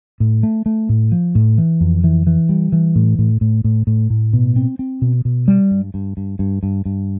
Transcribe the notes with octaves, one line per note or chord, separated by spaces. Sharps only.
A2
A3
A3
A2
F3
A2
E3
F2
E3
E3
G3
E3
A2
A2
A2
A2
A2
A2
B2
C4
C4
B2
B2
G3
G2
G2
G2
G2
G2
G2